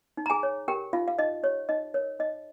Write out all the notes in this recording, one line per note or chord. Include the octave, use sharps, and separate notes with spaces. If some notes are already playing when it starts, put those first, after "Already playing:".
D#4
A#5
G#4 G#5
C#5
G4 A#4 G5
D#4 F4 F5
F5
D#4 D#5
G4 C#5
D#4 D#5
A#4 C#5
D#4 D#5